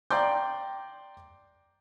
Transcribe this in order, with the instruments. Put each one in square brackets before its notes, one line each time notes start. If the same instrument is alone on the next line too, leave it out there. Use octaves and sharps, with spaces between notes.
[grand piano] D5 G5 A#5 C6 D6 G6